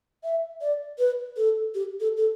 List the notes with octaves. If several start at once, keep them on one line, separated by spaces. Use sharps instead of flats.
E5
D5
B4
A4
G4
A4
A4